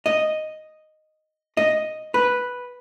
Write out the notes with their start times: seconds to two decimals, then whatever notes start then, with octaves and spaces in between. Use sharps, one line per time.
0.06 D#5
1.57 D#5
2.14 B4